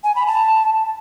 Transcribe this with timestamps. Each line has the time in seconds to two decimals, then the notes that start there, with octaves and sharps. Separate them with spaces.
0.04 G#5
0.16 B5
0.27 A5